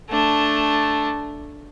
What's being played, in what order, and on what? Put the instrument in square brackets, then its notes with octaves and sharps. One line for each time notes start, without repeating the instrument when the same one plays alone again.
[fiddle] A3 D4